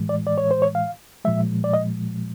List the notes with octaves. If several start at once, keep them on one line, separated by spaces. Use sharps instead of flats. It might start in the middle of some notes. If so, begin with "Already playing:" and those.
Already playing: A2 E3 G#3
D5
D5
C#5
C5
C#5
F5
A#2 F3 G#3 E5
D5
D#5